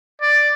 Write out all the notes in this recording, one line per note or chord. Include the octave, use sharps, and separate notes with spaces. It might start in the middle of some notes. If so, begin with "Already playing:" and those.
D5